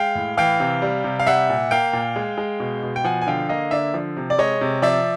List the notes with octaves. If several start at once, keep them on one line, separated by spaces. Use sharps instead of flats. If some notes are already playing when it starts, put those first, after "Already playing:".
Already playing: G#3 F5 G5
A2
E3 F5 G5
C3
G3
C3
F5
G3 E5 F#5
A#2
A#3 F5 G5
A#2
G#3
G#3
B2
B2
G5
F3 F#5 G#5
G#5
D3 F5 G5
A#3 D#5 F5
D3 D5 E5
F3
C3
D5
G#3 C#5 D#5
C3
F3 D5 E5